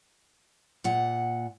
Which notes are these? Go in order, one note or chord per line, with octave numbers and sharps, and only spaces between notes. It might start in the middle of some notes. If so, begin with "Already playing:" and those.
A#2 F#5